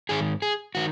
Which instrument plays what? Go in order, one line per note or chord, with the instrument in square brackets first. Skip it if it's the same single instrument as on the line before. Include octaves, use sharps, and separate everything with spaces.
[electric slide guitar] G#2 D#3 G#4
G#4
D#3 F#4